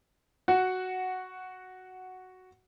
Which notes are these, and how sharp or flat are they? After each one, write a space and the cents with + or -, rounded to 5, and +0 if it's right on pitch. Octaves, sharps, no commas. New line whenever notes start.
F#4 +0 F#5 +0